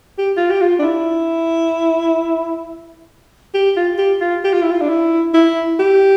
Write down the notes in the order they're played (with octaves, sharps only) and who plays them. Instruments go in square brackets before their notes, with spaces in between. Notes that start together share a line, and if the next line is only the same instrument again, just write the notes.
[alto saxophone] G4
F4
G4
F4
D4
E4
G4
F4
G4
F4
G4
F4
E4
F4
D4
E4
E4
G4